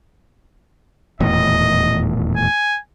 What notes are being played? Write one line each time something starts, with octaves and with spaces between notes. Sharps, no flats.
D#1 E2 A2 D#5
G#5